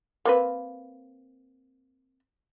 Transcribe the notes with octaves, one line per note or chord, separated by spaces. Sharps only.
A#3 C4 B4